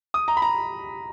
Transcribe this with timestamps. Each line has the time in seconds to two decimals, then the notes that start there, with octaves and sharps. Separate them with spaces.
0.14 D#6
0.28 A#5
0.37 B5
0.42 A#5